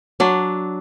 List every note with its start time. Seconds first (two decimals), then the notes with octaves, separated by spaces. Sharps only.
0.20 F#3 D4